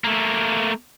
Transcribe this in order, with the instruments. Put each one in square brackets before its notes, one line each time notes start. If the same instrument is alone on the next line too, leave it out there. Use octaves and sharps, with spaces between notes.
[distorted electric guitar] A3 A#3